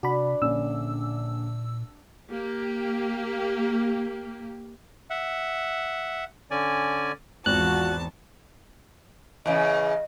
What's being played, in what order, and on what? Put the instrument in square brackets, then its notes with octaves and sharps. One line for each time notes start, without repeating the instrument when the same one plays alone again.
[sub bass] C3 [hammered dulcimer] D4 [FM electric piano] F#4 B5
[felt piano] A#1 D3 C#4 [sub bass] A#2 [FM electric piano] E6
[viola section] A#3 G4
[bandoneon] E5 F#5
D3 C#4 D5 G#5
[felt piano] G#1 [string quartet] E2 A5 [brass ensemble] F4 F#4 [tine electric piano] F#6
[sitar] E2 C#3 [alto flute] D#5